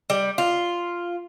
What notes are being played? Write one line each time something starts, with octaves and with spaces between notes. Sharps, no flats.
G3
F4